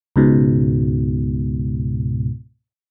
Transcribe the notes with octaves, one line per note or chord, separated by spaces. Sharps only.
C#2 G#2 B2